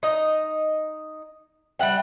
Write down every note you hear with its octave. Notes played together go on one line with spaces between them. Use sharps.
D#4 D#5
G3 E5 F#5 G5